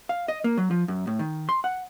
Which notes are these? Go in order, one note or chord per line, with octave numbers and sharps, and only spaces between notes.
F5
D#5
A#3
F#3
F3
F#2
A2
D#3
C6
F#5